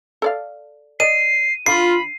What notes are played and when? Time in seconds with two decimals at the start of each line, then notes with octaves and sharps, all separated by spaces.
0.22 A4 D5 F5
1.00 D5 D#5 C7 D#7
1.66 D3 F4 B5 C7